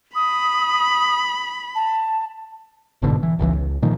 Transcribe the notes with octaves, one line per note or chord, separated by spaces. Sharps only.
B5 D#6
A5
G1 G#2 B2 D3
E3
G1 C#2 D3 E3
C#2
A#2 D#3 F3